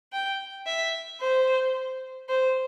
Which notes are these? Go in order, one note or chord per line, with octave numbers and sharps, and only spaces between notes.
G5
E5
C5
C5